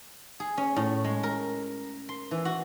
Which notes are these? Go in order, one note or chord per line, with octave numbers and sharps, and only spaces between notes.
G#4
C#4
A2
G#3
A#4
C6
E3
F#4